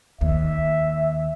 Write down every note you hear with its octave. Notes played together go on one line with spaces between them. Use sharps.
D#2 E5